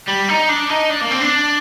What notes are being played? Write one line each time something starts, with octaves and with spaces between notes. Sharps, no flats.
G3
D#4
D4
D#4
D4
A#3
C4
D4